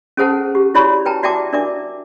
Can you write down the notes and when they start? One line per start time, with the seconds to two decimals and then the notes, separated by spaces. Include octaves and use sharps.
0.17 C#4 G#4 A4 C5 F#5 A5
0.55 G4
0.74 E4 F#4 C#5 D5 B5 C#6
1.06 B4 G5 A5 A#5
1.23 F#4 D5 E5 G5 A5 D6
1.53 D4 A#4 D5 E5 D6